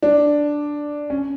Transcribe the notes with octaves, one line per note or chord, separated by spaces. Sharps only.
D4
C#4